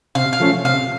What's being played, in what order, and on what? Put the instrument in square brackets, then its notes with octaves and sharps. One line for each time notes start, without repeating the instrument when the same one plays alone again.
[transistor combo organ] C3 [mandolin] F5
[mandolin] F5
[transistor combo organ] F3 A3 C#4
[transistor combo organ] C3 [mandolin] F5